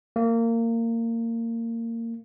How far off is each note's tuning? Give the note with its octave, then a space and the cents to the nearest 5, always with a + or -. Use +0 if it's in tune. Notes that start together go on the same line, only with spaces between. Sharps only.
A#3 -25